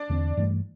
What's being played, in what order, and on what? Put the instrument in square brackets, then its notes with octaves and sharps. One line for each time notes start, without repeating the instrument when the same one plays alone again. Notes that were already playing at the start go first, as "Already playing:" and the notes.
Already playing: [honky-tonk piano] D4 D5
[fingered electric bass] E2 D3 A3 C4
G2 E3 A3